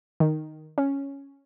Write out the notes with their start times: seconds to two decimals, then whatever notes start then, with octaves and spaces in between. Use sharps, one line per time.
0.20 D#3
0.78 C#4